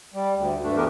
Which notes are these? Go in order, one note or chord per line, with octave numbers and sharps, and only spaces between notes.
G3
D2
D2 G2 A3 D4
E3 A3 B3 G4 A#4 B4